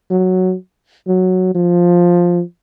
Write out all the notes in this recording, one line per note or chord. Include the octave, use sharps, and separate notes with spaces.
F#3
F#3
F3